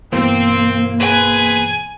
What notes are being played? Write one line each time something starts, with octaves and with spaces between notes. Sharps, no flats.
G2 B2 E3 A#3 C4
C4 G#4 B4 G#5